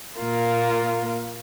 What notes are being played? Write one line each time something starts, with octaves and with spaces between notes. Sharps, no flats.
A#2 A#3 F4